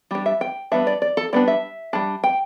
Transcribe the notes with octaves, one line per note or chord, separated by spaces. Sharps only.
G3 D4 G4
E5
G5
G3 B3 D4 E5
D5
D5
A4
G3 B3 D4 D5
E5
G3 D4
G5